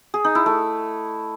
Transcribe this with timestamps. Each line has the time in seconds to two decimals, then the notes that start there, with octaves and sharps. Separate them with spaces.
0.14 G#4
0.24 D#4
0.35 E4
0.46 A3